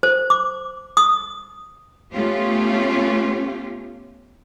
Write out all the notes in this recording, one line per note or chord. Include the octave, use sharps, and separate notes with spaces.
C5
D6
D#6
A3 B3 C#4 F4 G4